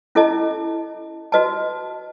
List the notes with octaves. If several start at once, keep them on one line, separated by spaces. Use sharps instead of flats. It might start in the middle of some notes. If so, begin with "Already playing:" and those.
C#4 E4 A4 D#5 A5
F#4 B4 D#5 A5